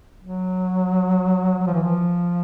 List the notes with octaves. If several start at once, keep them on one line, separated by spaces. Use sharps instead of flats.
F#3
F#3
F3
E3
F3